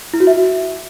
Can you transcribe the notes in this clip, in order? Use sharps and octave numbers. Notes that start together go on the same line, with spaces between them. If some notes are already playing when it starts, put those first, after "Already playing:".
E4
F#4
E5